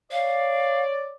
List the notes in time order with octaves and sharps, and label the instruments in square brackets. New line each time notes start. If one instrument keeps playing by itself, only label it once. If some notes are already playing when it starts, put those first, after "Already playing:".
[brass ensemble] C#5 D5 [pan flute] F5